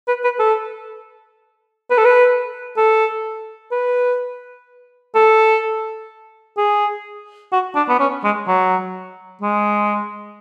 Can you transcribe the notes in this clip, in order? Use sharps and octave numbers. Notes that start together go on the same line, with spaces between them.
B4
B4
A4
B4
A4
B4
A4
B4
A4
G#4
F#4
D4
B3
C#4
G#3
F#3
G#3